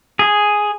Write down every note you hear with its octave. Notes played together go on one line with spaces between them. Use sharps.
G#4